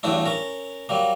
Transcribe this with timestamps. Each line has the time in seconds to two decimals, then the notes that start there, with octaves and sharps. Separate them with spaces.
0.03 E2 G2 F#3 A3 D4 E4
0.25 C#4 A#4
0.89 F#3 G3 A#3